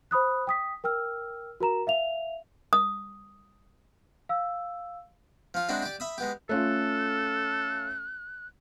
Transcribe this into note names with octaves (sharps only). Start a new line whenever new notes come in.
C5 B5 D#6 F#6
G5 D#6 B6
A#4 G5 E6 F6
F#4 A#4 A#5 E7
E5 F5 F7
D#6
F5 E6
F3 F4
G#3 C4 D4 E4 F#4
G4 D5
E5 B5 D#6
G#3 B3 G4
A3 C#4 F4 A4 F#6